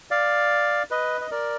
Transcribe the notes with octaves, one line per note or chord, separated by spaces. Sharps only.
D5 F5
B4 D#5
D#5
A#4 D5